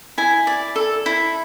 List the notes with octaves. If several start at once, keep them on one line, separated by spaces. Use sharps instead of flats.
E4 G#5
D5
A4
E4